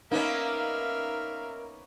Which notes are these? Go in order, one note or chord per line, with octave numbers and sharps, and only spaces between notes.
A#3 B3 C#4 D#4 A#4 E5 F5